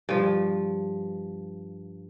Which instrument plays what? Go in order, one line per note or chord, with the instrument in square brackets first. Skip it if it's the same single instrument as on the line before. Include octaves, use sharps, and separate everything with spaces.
[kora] G2 F3